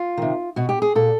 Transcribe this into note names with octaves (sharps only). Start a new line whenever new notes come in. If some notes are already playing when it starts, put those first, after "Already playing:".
Already playing: F4
C3 D#3
B2 F#4
G4
G#4
A#2 A4